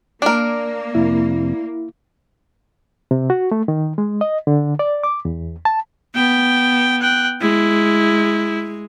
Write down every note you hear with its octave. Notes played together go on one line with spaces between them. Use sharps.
A#3 D4 A#4
F2 C3 E4
C3
F#4
A3
D#3
G#3
D#5
D3
D5
D6
E2
A5
B3 G5
G5 F#6
G#3 E4